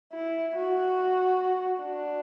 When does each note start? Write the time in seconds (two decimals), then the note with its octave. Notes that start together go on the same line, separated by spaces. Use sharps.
0.13 E4
0.56 F#4
1.82 D4